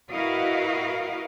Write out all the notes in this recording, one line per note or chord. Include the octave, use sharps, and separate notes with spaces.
E4 F#4 A#4 B4 D#5 F5